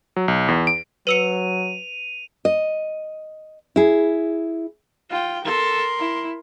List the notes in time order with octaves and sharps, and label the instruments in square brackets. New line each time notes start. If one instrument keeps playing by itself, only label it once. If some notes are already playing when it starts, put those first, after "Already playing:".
[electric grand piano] F#3
B1
E2
D7
[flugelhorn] F#3 [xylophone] B4 E6 C#7 [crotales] D#7 F7
[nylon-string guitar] D#5
E4 G#4
[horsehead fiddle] F4 G5
[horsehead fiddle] A4 [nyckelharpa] A#4 C6
[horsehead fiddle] E4